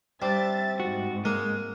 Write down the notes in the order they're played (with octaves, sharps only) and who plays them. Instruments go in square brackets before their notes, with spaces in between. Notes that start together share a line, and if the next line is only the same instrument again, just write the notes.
[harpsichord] G3 [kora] C4 D4 C5 [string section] E5 A6
[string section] G#2 [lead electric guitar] F#4
[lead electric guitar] G#3 [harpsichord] A#3